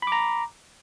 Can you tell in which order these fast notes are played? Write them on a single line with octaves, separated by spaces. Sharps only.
B5 D6 A#5